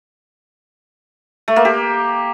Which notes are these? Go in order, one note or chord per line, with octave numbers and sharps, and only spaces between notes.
A3
A#3
G4